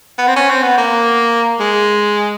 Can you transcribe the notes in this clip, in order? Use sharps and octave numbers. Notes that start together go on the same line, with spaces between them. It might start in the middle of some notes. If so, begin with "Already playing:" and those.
B3
C4
C#4
C4
B3
A#3
G#3